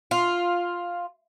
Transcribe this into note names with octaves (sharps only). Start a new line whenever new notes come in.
F4